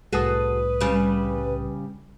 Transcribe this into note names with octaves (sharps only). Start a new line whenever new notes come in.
C2 A2 F#4 G#4 A4 B4 D#6
C#3 G3